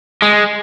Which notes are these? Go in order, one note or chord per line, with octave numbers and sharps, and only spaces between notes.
G#3